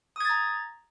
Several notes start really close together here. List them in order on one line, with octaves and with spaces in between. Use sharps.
D#6 G#6 A6 A#5